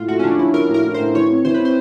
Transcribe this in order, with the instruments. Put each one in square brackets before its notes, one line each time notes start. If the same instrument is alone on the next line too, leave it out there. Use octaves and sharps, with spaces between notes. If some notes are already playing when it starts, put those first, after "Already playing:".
Already playing: [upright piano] A2 [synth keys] F4
[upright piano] A3 [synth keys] F#4
[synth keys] C#4
[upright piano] F3 [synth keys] D4
[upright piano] F3 [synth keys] E4
[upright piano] F3 [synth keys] A#4
[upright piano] A2
[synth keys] A#4
[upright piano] A2
[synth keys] C5
[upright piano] A2
[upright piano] E3 [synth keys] C#5
[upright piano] C4
[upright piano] E3 [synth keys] C5
[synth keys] B4
[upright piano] C4
[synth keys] C5